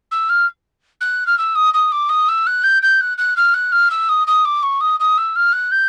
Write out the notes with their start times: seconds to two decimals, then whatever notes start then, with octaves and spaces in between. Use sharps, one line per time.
0.12 E6
0.29 F6
1.01 F#6
1.27 F6
1.38 E6
1.55 D#6
1.74 D#6
1.92 D6
2.09 D#6
2.29 E6
2.47 F#6
2.64 G6
2.82 G6
3.01 F#6
3.18 F#6
3.37 F6
3.54 F#6
3.72 F6
3.91 E6
4.09 D#6
4.27 D#6
4.45 D6
4.63 C#6
4.81 D#6
5.00 D#6
5.18 E6
5.36 F6
5.53 F#6
5.72 G6